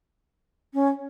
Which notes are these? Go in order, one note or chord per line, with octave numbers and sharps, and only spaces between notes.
C#4